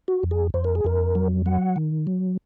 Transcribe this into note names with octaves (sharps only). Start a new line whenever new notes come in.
F#4
F2
G#4
F2 C5
A#4
G#4
F2 A#4
F#3
F#3 F#5
D#3
F#3